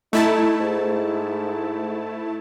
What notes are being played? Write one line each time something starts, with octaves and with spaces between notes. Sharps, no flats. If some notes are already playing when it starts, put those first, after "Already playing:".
A3 D#4 E4 A5
G#2